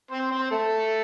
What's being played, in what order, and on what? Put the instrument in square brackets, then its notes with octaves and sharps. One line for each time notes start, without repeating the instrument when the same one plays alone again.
[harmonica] C4 C5
C4 C5
A3 A4